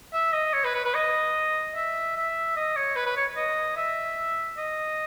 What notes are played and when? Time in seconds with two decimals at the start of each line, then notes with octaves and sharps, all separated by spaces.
0.13 E5
0.33 D#5
0.53 C#5
0.64 B4
0.74 B4
0.85 B4
0.94 D#5
1.75 E5
2.16 E5
2.56 D#5
2.76 C#5
2.96 B4
3.06 B4
3.17 C#5
3.36 D#5
3.77 E5
4.57 D#5